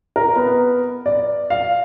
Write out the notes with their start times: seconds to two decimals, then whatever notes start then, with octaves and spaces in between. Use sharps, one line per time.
0.16 A#4
0.36 B3
1.06 D5
1.50 F5